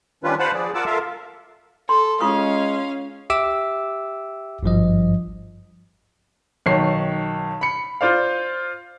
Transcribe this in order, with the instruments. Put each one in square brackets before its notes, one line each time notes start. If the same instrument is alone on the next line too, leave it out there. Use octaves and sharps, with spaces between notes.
[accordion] D#3 G3 C#4 D4 F4 B4
B4 C5 F5 F#5 A5 B5
F3 G#4 D5
F4 A#4 F#5 A5 D6 E6
F4 A4 A#4 E5 F5
[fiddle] A4 [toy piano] C6
[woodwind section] G#3 [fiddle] C#4 F5 [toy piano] F4 C#6 D#6
[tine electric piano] G4 E5 D6 E6
G#1 G2 F3 D#5
[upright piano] B1 D#3 C#5 C7
B5 C#7
F4 C5 D5 F5